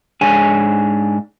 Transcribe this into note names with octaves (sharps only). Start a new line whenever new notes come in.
G#2 D4 G#4 C#5 G#5